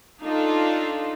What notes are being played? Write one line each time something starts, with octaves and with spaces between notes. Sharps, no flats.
D4 D#4 F4 A4